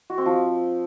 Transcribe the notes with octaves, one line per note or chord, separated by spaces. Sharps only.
F#4
C4
F3